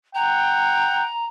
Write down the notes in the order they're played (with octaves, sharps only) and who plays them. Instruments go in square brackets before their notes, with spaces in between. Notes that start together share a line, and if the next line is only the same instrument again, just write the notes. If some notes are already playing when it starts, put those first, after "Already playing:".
[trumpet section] F#5 G5 [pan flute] A#5